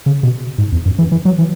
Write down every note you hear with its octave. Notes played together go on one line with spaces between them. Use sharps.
C#3
B2
G#2
E2
F#2
E3
E3
F#3
E3